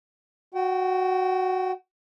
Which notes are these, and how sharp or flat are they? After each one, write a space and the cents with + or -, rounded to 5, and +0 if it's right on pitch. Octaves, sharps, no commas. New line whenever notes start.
F#4 +0 G5 -35